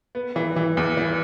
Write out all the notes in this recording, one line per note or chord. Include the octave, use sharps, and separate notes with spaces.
B3
E3
E3
E2
E3